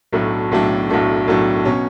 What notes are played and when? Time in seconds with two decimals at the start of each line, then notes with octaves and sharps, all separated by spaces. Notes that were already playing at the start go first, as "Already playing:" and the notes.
0.13 B1 A2 F#3 A3 D4
0.51 B1 A2 F#3 A3 D4
0.89 B1 A2 F#3 A3 D4
1.27 B1 A2 F#3 A3 D4
1.65 B2 F#3 C#4